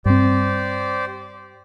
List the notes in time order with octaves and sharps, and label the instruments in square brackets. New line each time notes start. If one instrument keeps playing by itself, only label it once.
[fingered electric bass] G2 C4 [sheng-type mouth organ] G4 C5 D5